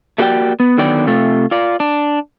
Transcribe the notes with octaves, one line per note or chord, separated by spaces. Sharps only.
A3 A#3 F#4 G4 D5 G5
B3
D3 D#3 F#3 B3 D5 G5
C3 A3 F4
F4 D5
D4